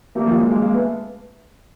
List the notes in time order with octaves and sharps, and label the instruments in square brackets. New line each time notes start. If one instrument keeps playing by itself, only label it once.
[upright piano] G3 A3 [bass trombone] A#3
[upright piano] F3 G3
F#3 G#3
G#3 A#3
G#3 A#3
A3 B3